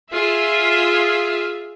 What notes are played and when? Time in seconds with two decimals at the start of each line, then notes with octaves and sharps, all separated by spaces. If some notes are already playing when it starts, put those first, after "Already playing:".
0.12 F4 G#4 E5